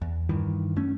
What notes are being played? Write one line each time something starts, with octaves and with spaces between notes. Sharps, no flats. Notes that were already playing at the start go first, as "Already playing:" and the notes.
E2
G2 D#3 E3
F#2 A3 C#4